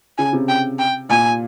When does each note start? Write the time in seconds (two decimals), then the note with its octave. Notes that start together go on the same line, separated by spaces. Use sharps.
0.18 C#3 G#5
0.33 C3
0.48 G5
0.79 G5
1.09 A#2 G#5